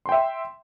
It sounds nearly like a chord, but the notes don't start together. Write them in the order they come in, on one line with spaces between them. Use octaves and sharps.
C6 G5 E5